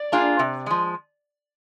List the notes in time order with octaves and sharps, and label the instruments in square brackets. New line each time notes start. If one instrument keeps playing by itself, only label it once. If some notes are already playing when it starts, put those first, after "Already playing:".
Already playing: [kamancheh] D5
[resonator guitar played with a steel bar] A#3 D4 F4 G#4
C3
F3 G#3